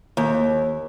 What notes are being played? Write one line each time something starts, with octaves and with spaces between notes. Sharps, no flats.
D#2